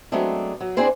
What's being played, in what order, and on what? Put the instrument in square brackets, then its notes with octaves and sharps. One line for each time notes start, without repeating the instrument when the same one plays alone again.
[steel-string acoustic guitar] F#3 G#3 A3 B3 C4 D4
F#3
C4 D4 E4 G#4 C5 D5